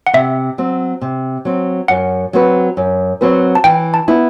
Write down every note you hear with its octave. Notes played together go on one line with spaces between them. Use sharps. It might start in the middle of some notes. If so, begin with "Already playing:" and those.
F#5
C3 E5
F#3 C4
C3
F#3 C4
F#2 F#5
F#3 C4 F#4 B4
F#2
F#3 C4 F#4 B4
A5
E3 G5
A5
B3 E4